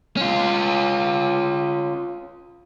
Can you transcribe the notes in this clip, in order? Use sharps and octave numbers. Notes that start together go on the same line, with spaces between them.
C#4 F4